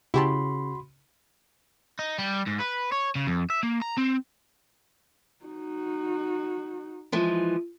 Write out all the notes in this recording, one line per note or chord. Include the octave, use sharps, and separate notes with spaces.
C#3 E4 F#4 G4 A5 B5 C6
D#4
G3
G#2
B4
C#5
C#3
F2
E5
A#3
A#5
C4
D#4 F#4
E3 F3 G#3